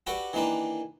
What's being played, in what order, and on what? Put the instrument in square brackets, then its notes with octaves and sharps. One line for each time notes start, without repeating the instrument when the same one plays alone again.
[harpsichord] F#4 G4 A4 B4 D5
D#3 E3 A#3 D4 B4